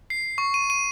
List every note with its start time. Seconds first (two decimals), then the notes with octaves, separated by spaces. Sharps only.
0.10 C7
0.38 C#6
0.54 D#7
0.70 D#7